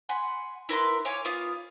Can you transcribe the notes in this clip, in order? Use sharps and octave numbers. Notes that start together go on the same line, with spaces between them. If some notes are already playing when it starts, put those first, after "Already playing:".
F#5 G#5 B5 C6
E4 A#4 B4 C6
C#5 F5 G#5 D6
B3 F4 F5 D#6